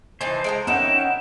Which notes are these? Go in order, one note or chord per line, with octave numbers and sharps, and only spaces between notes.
E3 D#4 C5 G#5 A5
G#3 G5 A#5
D#3 C#4 D#4 E4 B4 F#5 G5 E7